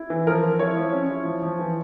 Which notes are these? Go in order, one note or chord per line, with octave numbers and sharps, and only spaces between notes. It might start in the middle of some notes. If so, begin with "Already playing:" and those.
Already playing: E4
E3
F3 A#4
F3
E4 C#5
F3
C#4
E4
F3
F3
E3